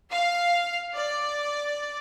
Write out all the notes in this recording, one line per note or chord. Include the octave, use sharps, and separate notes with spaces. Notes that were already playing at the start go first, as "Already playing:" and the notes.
F5
D5